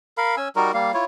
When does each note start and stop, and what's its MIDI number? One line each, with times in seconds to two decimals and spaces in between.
0.18 0.36 70
0.18 0.36 77
0.18 0.36 83
0.37 0.49 61
0.37 0.49 80
0.37 0.49 88
0.56 0.72 55
0.56 0.72 63
0.56 0.72 66
0.56 0.72 70
0.74 0.92 55
0.74 0.92 58
0.74 0.92 77
0.94 1.05 64
0.94 1.05 65
0.94 1.05 73